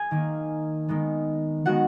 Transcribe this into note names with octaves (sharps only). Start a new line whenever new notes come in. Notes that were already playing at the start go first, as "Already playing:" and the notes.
Already playing: G#4 G#5
D#3 A#3
D#3 G#3 B3
D#3 G#3 B3 F#4 F#5